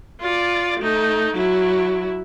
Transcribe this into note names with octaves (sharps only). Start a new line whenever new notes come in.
F4 D5
A3 D#4
F#3 E4